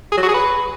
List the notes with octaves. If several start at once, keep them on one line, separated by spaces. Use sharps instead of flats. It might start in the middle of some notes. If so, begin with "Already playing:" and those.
G#4
F#3
F#4
G#4
B4